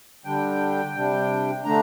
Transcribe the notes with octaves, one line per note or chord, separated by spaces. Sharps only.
D3 G3 D4 G5
C3 G3 D4
D3 A3 D4 A#5